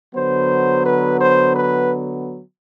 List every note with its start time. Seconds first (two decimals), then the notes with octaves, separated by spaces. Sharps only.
0.15 D3 F#3 B3 C5
0.86 B4
1.20 C5
1.56 B4